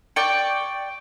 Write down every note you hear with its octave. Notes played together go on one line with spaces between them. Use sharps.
D5 G5 C#6